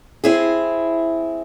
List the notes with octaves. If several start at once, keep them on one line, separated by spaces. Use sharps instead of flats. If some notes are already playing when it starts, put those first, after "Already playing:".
C4 E4 G#4